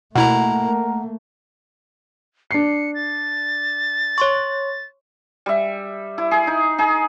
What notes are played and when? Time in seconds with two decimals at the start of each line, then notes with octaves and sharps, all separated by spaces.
0.16 B2 A3 A#3 E4 A#4 F#5 A#5
2.51 D4 C7 C#7
2.95 A6
4.18 C#5 C6 C#6
5.46 G3 E5
6.18 E4
6.31 G#4
6.47 D#4
6.78 D#4 G#4